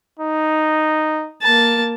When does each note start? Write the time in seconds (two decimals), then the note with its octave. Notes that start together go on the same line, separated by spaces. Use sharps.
0.19 D#4
1.42 A#3 A5